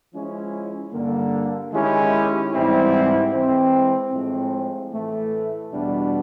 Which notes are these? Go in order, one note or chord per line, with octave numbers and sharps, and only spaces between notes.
F3 G#3 C#4 E4
G2 D3 G3 A#3
D#3 G#3 C#4 E4 G4
G#2 E3 G3 C4 E4
E3 G#3 C4
A2 F3 G#3 C4
A2 E3 A3
E2 B2 G3 B3 D4